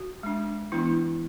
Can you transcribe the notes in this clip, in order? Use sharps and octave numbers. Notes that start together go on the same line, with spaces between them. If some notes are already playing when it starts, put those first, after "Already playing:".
Already playing: F#4
G#3 D4
E3 B3 D4 E4